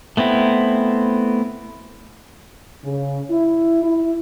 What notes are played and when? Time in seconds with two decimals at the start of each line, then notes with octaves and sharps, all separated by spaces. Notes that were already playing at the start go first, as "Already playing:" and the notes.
0.17 A3 B3 C4 E4
2.85 C#3
3.31 E4
3.84 E4